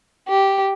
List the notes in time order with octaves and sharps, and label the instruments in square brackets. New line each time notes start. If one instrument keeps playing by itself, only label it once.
[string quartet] G4